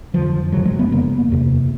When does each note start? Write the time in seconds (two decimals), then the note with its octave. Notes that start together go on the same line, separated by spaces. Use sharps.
0.14 F2 D3 F3
0.52 F#2 C#3 F#3
0.65 G#3
0.79 B3
0.92 F#2 C#3 A#3
1.32 E2 C3